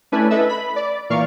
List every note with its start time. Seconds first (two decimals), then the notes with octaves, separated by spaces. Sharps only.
0.12 A3 C#4 D4 E4 B4 G#5
0.30 A4 B4 D#5 E5 A5
0.49 B5
0.76 D5
1.10 A#2 E3 A#3 D5 F5 C#6